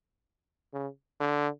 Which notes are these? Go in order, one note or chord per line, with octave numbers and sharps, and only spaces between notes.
C#3
D3